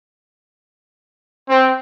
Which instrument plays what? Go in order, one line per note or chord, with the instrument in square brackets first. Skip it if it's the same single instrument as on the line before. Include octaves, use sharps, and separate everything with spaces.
[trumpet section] C4